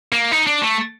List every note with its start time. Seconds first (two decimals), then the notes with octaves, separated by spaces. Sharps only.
0.13 A#3
0.32 D#4
0.47 D4
0.61 A3